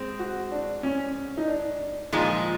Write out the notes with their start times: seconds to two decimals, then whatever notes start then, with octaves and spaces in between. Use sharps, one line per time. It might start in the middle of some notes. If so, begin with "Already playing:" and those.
Already playing: G#3 C4
0.19 F#4
0.52 D4
0.83 C#4
1.37 D#4
1.48 D4
2.12 A#2 F3 G#3 D#4